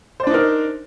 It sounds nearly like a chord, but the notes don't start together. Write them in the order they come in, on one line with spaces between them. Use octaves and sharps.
C5 D5 D4 D#4 A#4